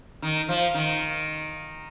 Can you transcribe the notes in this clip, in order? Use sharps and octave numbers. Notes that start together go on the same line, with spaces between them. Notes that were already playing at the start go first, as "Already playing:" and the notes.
D#3
F3
D#3